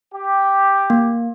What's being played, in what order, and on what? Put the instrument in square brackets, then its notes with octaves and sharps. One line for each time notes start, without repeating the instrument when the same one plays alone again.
[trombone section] G4
[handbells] A#3